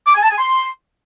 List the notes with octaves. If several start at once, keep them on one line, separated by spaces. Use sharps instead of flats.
D6
G#5
A5
G#5
C6